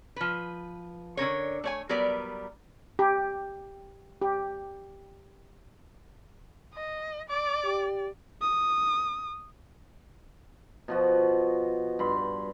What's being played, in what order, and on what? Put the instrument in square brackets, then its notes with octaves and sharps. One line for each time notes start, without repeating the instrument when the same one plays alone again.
[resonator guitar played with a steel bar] F3 B4
D3 C#4 A#4 C#5
A3 C#5 G#5
F#3 G3 B3 A#4 B4 D5
[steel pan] G4
G4
[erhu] D#5
[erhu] D5 [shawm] D6
[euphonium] G4
[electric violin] D#6
[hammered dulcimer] B2 F3 F#4
G2 B5 C6